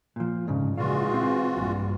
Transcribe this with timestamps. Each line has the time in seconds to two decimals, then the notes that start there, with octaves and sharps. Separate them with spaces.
0.16 A#2 F3
0.47 D2 G#2 C#3
0.78 C#2 A#2 E3 G#3 F4 F#4 F5
1.14 C4
1.54 A#1 G2